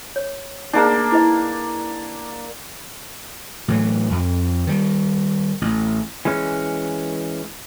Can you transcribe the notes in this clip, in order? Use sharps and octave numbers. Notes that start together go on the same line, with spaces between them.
C#5
A#3 D4 D#4 G#4
E4 B4 D#5
A2 E3 F#3
F2
D#3 G3
A1
E3 G#3 C#4